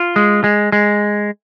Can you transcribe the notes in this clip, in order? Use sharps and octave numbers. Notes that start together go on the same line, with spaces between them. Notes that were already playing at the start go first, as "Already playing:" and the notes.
Already playing: F4
G#3
G#3
G#3